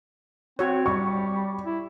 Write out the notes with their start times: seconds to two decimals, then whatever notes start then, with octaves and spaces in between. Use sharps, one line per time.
0.59 C4 F#4 C#5
0.86 G3 C#6
1.65 E4